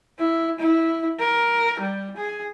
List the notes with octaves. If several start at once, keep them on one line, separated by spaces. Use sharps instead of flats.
E4
E4
A#4
G3
G#4